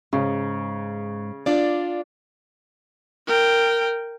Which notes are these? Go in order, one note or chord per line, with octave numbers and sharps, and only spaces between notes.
G#2 C#3
D4 F4 D5
A#4 G5